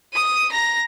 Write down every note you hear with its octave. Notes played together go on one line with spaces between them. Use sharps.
D#6 D#7
A#5 A#6